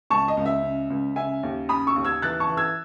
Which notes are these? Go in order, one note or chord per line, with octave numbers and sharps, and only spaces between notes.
C#2 A5 C#6
D#5
C#2
E5
C#3
C#2
C#3 E5 G#5
D#2
C#3 B5 D#6
C#6 E6
D#2
E6 G#6
E3 F#6 A6
A5 C#6
E3
E6 G#6